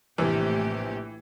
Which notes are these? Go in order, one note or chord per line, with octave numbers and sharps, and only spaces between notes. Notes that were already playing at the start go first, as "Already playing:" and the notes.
A#1 A2 C3 E3 G4